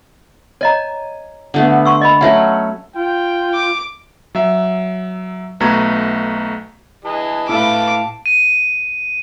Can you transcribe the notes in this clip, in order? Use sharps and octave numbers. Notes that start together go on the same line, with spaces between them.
C#5 D#5 G#5 A#5
D3 A3 B3
C6 C#6 E6
D#5 B5
F#3 A3 C#4 C#5 E5 F#5
F4 G5
D6
F#3 E5
B1 A3 B3 F#4 A#5 G#6
E3 G#4 D#5 A5
A2 E4 A4 B4 F5 D6
D#7